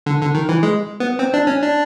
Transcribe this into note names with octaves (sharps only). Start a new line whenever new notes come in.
D3
D3
D#3
E3
G#3
B3
C4
D4
C#4
D4